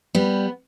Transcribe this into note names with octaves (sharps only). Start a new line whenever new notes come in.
G3 B3